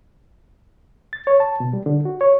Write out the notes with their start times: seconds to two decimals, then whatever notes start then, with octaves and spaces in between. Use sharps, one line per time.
1.13 A6
1.27 C#5
1.40 A5
1.60 B2
1.73 G3
1.86 D3
2.05 F#4
2.21 C#5